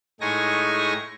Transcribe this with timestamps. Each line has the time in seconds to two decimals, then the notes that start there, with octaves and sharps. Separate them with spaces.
0.21 A2 G#3 D#4 G#5 C#6 A#6